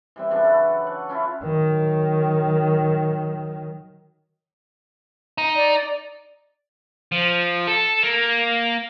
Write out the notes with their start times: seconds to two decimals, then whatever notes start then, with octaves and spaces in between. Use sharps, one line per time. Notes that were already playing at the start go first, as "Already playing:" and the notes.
0.16 E3 G3 C4
0.30 C#3 E3 F#3 D4
0.44 A4 B4
0.84 C#5 F#5
1.09 C#4 E4 F4
1.43 D#3 F#3
5.38 D#4
5.56 D5
7.12 F3
7.67 A4
8.03 A#3